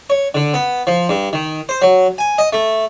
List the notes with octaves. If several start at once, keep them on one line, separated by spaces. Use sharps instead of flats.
C#5
D3
B3
F3
G2
D#3
C5
F#3
G#5
D#5
A3